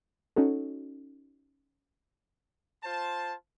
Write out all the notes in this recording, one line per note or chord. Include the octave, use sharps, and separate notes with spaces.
C#4 D#4 F#4 A4
F4 C5 A5